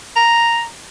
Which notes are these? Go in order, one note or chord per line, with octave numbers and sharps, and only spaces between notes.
A#5